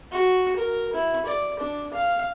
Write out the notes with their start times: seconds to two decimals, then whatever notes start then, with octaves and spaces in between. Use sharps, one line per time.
0.12 F#4
0.56 A#4
0.93 E4
1.25 D5
1.59 D4
1.94 F5